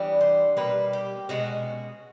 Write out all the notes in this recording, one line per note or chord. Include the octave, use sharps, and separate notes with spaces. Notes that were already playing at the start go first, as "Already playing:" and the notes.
Already playing: E3 G3 B3 D4
C5
B2 G3 A#3 B4
G4
B2 G#3 C#4 F#4